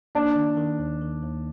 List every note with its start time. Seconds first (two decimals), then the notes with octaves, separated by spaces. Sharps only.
0.15 A#3 D4
0.36 D#3
0.57 D#3
0.79 D#2
1.01 D#3
1.22 D#2